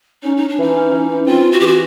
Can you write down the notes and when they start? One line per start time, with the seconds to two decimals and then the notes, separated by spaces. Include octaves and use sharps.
0.23 C#4 D#4
0.37 C#4 D#4
0.49 D4
0.58 E3 D#4
0.75 C#4
0.92 E3
1.09 C#4
1.26 C4 F4
1.44 C4
1.52 F#4
1.60 E3 G4
1.67 F#4